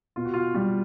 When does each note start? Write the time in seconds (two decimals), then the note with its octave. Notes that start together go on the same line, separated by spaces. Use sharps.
0.16 B2 F4
0.25 F#4
0.34 F4
0.55 G3 F4